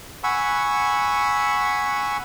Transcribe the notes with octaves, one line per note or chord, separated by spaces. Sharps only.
F#5 G#5 B5 C#6 E6